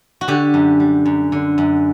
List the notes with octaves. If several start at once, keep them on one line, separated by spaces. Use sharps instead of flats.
F#4
D3 G4
F#2
G3
F#2
D3
F#2